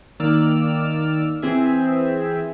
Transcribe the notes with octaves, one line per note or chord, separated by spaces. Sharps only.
D#3 A#3 D5 E6 F6
E3 C4 G#4 E5